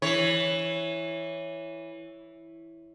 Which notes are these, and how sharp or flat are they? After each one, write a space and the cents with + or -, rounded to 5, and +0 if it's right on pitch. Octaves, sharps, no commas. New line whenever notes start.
E3 +0 C#5 +0